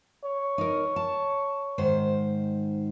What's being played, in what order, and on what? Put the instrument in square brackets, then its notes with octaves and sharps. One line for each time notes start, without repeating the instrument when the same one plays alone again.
[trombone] C#5
[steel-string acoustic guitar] D#4 A#4
A5
G#2 D#3 C5